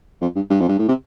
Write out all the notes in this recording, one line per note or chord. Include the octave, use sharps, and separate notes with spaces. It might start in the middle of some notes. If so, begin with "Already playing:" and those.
F2
G2
G2
F2
G2
A2
C3